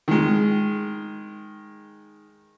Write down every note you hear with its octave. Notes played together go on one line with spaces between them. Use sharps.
D#3 G#3